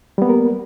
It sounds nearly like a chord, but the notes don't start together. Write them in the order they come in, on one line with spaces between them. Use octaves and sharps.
G3 B3 A#3 A#4